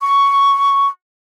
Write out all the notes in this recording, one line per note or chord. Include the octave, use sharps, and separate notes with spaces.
C#6